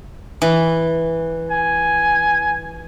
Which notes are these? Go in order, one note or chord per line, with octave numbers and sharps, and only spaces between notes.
E3
G#5